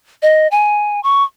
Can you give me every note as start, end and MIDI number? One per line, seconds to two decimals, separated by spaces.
0.22 0.48 75
0.51 1.00 80
1.03 1.23 85